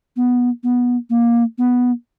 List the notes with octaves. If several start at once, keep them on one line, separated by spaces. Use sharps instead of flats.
B3
B3
A#3
B3